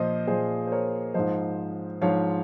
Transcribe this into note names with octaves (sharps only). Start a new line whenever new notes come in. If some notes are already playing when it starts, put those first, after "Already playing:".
Already playing: A#2 F3 C5 D#5
A#2 F3 G#4 C5
C5
A#4 C#5
G#2 F3 C5 D#5
G#2 F3 C#5 F5